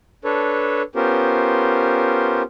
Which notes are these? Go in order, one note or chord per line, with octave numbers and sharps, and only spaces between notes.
D4 A4 B4 C#5
B3 C#4 F4 G4 A#4 C5